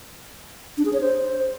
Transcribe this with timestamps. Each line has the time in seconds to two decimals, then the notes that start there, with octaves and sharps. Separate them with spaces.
0.78 D4
0.85 G#4
0.93 C#5
1.01 C5